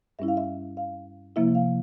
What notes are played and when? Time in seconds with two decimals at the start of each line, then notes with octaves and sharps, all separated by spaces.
0.19 G2 G3 C#4 E4 E5
0.28 F5
0.37 E5
0.77 F5
1.36 C3 F3 A#3 E4 E5
1.55 F5